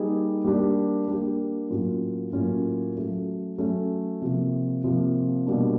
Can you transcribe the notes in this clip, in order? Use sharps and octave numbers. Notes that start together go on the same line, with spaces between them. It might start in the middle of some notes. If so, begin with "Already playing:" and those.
Already playing: G3 A#3 D#4 G#4
G3 A#3 D4 G4
G3 A#3 D4 G4
A2 F#3 A#3 C#4 F4
A2 F#3 A#3 C#4 F4
F#3 A3 C#4
F#3 A3 C#4
C3 F3 A#3
C3 F3 A#3
B2 G3 A#3 D4